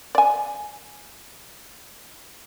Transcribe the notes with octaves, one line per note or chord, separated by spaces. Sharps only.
D5 G#5